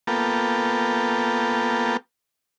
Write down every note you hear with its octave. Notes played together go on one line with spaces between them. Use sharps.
A#3 B3 F4 A4 G5